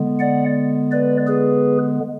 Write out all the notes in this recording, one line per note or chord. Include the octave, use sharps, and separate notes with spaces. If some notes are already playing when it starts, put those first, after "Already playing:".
Already playing: D3 G#3 B3
D5 F#5
B4 D5
G#4 B4